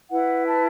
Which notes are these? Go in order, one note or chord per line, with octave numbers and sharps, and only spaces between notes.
E4 B4 F#5
A5